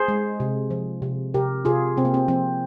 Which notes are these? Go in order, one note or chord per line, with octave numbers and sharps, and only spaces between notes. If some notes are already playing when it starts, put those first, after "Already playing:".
Already playing: G#4 C5
G#3
C3
F3
C3
C3 G4 A#4
C3 F4 G#4
C3 C4
A#3
C4
F3 C4